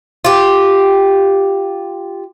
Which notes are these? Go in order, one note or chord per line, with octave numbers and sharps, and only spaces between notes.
F4 G4